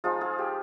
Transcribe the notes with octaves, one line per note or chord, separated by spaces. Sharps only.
F3 G#3 D#4 F4 G#4
F4 G#4
G4